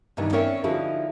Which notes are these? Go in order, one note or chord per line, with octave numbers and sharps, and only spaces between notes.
G2 C3 D#3 E3
C4 C#4 A#4 C#5 D5 E5
D3 F3 D#4 E4 F#4 G#4